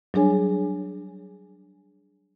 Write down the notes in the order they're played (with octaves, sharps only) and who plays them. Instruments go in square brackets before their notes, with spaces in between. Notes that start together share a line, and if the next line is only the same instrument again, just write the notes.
[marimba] F#3 G3 D4 G#4 C#5 G#5